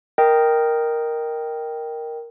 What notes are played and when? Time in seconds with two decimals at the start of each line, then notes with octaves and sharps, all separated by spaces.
0.18 A#4 D#5 G5